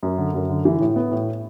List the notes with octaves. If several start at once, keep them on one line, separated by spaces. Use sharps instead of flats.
F#2
D3
F#2
D3
E3
A2
B3
A2